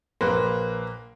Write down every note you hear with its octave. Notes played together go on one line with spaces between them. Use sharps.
A#1 A#3 B4 C6